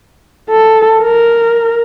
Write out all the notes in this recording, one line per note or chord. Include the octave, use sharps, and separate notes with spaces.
A4
A#4